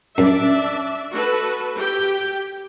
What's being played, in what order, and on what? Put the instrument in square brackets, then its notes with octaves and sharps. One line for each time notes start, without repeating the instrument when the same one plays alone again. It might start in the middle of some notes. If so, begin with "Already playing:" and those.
[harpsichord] F#2 [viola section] D4 D5 E5
[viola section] F#4 A4 B4
G4 G5